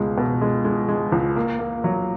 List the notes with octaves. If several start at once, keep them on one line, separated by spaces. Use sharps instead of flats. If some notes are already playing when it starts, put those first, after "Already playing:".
Already playing: C#2 B2 G#3
B2
G#3
G#3
G#3
C#2
A#3
A#3
F#3